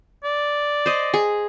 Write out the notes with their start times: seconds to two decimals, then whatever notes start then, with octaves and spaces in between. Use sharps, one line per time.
0.24 D5
0.86 C5 D#5
1.14 G#4